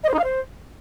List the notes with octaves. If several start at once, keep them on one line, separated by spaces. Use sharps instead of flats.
D#5
C5
D#4
F5
C5